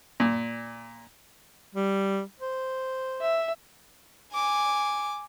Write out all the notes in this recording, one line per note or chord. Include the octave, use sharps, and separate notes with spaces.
A#2
G3
C5
E5
G#5 D6